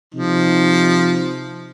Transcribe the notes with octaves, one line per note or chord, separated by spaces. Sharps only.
C3 F3 D#4